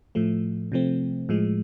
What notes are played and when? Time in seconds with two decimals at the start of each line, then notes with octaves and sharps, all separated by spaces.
0.15 A2 F3 A3
0.72 C3 F3 A3 C4
1.29 A2 F3 G#3